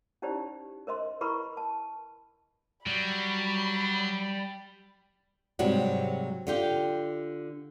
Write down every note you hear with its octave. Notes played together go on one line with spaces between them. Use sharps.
C#4 D#4 E4 G4 C5 D5
A#4 C5 D#5 C6
E4 A#4 B4 B5 C#6
A5
F#3 G3 B5
G#2 C3 F#3 G3 F#4
D3 F4 G4